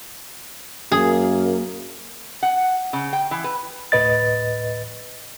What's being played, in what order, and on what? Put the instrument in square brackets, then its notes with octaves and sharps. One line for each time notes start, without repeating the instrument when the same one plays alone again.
[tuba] F#2 [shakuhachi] A#3 [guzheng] G#4
[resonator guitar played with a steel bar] F#5
C#3
G5
E3
B4
[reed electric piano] D2 A2 B4 D#5 A6